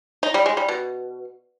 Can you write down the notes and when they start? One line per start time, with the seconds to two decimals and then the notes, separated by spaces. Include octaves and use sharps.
0.23 D#4
0.34 G3
0.46 G#3
0.57 G3
0.68 B2